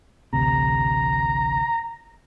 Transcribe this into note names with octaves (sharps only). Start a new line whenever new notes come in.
A1 D2 C3 A#5